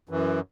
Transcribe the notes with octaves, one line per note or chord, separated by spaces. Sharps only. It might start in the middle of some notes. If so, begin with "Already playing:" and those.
F#2 E3